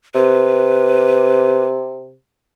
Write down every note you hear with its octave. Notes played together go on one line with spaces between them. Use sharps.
C3 B4